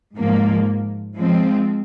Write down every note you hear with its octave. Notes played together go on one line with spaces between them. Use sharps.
G#2 F3 A#3
F3 G#3 C4